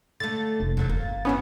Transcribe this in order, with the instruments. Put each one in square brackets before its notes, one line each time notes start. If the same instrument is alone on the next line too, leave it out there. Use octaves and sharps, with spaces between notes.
[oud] D3 A3 [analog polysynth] A6
[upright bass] F1 C3
[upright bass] E1 D#3 [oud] D3 F#3 A3
[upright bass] G1 [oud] A#3
[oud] F#2 E3 F#4 [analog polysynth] B3 C#4